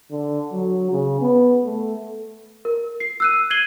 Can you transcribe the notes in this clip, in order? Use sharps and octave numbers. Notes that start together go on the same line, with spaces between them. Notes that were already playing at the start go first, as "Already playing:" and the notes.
D3
F#3
C#3
B3
A3
A#4
C7
E6 F#6 D#7
G#6 C7 D#7 F#7 G7